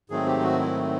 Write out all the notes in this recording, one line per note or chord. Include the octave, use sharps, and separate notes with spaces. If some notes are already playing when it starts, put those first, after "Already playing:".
G#2 D#3 F#3 A3 C4 G#4
G4
F#4
E4